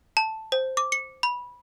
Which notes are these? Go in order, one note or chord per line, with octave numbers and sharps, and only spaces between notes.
A5
C5
D6
C#7
B5